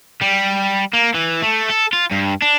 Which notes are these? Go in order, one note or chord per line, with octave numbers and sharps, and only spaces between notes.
G3
A#3
E3
A3
A4
F4
G2
D4